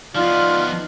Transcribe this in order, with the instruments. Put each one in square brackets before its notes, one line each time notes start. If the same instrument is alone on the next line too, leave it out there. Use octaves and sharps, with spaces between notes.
[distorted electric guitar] F3 B3 [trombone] D#4 [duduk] F4 [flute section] D5 F6